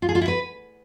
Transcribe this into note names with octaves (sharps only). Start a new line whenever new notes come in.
F4
G#4
F4
E4
B4